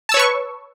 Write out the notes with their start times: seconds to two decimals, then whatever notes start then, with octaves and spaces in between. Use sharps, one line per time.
0.09 A5
0.12 E6
0.14 C#5
0.17 B4
0.19 C#6